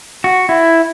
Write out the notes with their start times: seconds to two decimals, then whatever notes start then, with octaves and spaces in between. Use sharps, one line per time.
0.24 F#4
0.49 E4